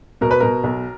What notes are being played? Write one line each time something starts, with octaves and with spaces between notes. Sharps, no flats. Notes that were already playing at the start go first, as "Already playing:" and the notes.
B2 A#4
B4
B2 A#4
B1